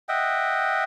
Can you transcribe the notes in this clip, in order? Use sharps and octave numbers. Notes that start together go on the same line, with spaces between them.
D#5 E5 F#5 G5